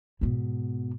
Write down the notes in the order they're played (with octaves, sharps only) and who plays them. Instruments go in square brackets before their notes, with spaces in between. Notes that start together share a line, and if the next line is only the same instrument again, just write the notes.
[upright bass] G#2 B2